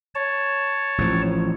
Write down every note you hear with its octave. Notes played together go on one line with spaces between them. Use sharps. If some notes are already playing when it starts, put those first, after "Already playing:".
C#5 A5
A1 F3